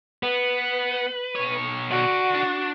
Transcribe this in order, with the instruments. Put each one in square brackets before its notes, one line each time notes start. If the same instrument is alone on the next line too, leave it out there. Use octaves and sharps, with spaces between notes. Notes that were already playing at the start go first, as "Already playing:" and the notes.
[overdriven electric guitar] B3 [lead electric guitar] B4
[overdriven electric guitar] B2 C#5
[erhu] F#4 [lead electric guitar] D5 F#5
[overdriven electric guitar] D4